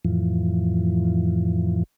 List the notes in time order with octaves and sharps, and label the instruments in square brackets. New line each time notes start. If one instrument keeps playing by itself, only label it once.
[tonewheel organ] F2 A2 E3 F3